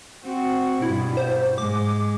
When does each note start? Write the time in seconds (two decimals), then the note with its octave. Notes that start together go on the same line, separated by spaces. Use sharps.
0.25 C4 F#4
0.82 G2 B2 E4
1.17 C5
1.58 G#2 G#3 D6